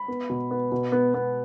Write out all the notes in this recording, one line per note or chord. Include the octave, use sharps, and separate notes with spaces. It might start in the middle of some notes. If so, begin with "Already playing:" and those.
Already playing: B5
B3
B2
B3
B2
B3
B3